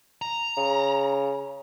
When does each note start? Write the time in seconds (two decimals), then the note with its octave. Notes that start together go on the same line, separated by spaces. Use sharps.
0.22 A#5
0.57 C#3